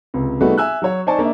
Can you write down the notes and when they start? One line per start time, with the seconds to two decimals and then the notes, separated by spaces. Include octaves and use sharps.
0.14 C#2 C3
0.41 G3 A3 B3 D#4 F#4 G#4
0.58 E5 G#5 E6 F#6
0.82 F#3 F#4 C#5
1.07 D#4 C5 D5 G#5 A5 C#6
1.19 A#3 D4 D#5 E5